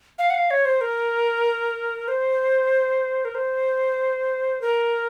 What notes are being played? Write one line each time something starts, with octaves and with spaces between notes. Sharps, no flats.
F5
F#5
F5
C#5
C5
A#4
C5
A#4
C5
A#4